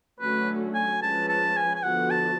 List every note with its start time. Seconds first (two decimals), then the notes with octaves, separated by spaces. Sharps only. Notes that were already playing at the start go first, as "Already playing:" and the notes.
0.21 D3 F#3 A3 C#4 F#4 B4
0.74 G#5
1.02 F3 G#3 C#4 G#4 B4 A5
1.29 A5
1.57 G#5
1.75 G#5
1.83 D3 F3 B3 F#4 F#5
2.10 A5